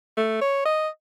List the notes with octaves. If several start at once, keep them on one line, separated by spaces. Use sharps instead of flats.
A3
C#5
D#5